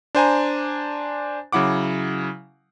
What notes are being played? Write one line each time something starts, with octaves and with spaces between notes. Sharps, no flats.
D4 C5 G#5 A#5
C#3 F#3 E4 F#5 D6